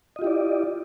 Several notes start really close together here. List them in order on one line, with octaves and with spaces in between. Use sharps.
D#5 F4 G4 E4 D5